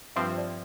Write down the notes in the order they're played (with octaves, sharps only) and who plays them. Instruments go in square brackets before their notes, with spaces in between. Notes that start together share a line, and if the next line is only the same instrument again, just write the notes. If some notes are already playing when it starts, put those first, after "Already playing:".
[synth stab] G2 F3 C4 [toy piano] E5
[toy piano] D5